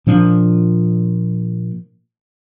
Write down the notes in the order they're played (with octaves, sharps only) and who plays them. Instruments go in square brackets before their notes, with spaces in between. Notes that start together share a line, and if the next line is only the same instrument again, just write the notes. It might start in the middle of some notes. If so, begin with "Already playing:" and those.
[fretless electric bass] A#2 F3 D4